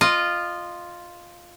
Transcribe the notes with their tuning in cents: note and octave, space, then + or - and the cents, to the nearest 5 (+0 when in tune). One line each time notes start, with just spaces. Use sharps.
F4 +0 D#5 -20